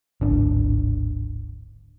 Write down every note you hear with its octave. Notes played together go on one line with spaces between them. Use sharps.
D1 G#1 D4